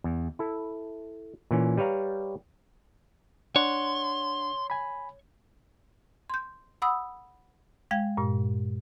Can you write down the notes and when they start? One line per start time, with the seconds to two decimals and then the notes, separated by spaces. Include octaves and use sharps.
0.04 E2
0.39 E4 A4
1.51 A#2 E3 C#4
1.77 G3 B4 C#5 F5 A#5
3.56 D4 C#5 F#5 C6
4.70 G#5 B5
6.30 C6 G6
6.82 F#5 B5 D#6 E6
7.91 G#3 F5 G5 G#6
8.17 G2 A#2